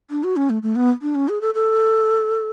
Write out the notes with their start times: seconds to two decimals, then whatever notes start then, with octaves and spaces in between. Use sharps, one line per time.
0.10 D4
0.24 F#4
0.36 C#4
0.50 A3
0.63 A3
0.76 B3
1.02 D4
1.15 C#4
1.29 G#4
1.41 A4
1.55 A4